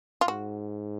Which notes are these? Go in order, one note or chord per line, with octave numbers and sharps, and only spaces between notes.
F4
G#2 F#4